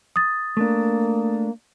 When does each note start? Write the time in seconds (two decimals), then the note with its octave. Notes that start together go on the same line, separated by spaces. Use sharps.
0.16 D#6 A6
0.57 A3 A#3 D4